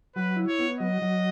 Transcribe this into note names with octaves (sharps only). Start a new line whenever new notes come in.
F#3 B4
E4
C#5
B3
F#3 D#5
F#3